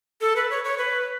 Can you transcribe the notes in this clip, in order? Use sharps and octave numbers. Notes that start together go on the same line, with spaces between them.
A4
B4
C#5
C#5
B4